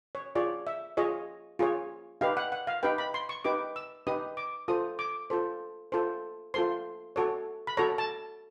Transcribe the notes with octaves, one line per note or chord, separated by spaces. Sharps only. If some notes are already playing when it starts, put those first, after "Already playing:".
C#5
F4 G#4 C#5 D5
E5
F4 G#4 C#5 D#5
F4 G#4 C#5
D#4 G4 B4 F5
F#5
F#5
F5
D#4 G4 B4 G5
B5
C6
C#6
D#4 G4 B4 D6
E6
D#4 G4 B4 D#6
D6
F4 A4 C5 D#6
D6
F4 A4 C5
F4 A4 C5
F4 A4 C5 C6
F#4 A4 C#5
B5
F#4 A4 C#5 A#5
A5